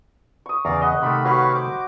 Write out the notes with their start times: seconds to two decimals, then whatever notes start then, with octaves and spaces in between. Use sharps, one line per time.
0.46 C#6 D#6
0.65 E2 C#3 D5 F5 A#5
0.81 B4 D#5 F#5
1.02 C3 D#3 A3 B5
1.25 F#4 B4 C#5 F5 B5
1.55 C5 D6